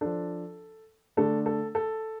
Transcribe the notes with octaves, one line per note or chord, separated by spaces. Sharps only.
F3 D4 A4
D3 A3 D4 A4
A4
A4